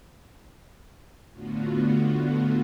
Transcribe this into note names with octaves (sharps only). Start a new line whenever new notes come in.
A2 D3 B3 F4 F#4